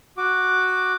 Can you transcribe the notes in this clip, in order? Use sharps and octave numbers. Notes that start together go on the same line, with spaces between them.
F#4 D6